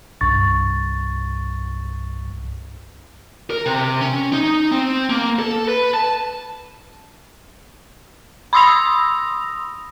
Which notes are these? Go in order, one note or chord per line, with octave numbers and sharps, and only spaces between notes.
C2 G2 C#6 A6
A#4
C3
C#4
D#4
C4
A#3
A4
B4
A5
B5 C6 D#6 E6 A#6 F7